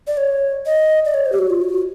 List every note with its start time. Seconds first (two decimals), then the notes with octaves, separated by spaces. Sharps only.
0.07 D5
0.17 C#5
0.66 D#5
1.05 D5
1.14 C#5
1.26 C5
1.32 G4
1.39 F#4
1.50 F4
1.62 F#4